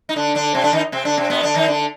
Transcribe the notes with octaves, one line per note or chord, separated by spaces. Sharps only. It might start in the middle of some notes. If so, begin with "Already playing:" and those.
D#4
D3 D4
D3 D4
C3 C4
D3 D4
D#3 D#4
C3 C4
D3 D4
C3 C4
B2 B3
D3 D4
D#3 D#4
D3 D4